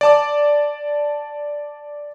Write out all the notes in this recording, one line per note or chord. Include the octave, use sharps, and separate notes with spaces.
D5 A5 D6